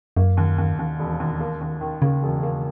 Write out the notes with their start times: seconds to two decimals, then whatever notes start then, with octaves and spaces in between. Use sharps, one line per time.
0.17 F#2 A#3
0.37 D#2
0.58 D#2
0.79 D#2
0.99 E1
1.20 D#2
1.40 A#3
1.61 D#2
1.81 D#3
2.02 C#3 A#3
2.23 E1
2.43 A#3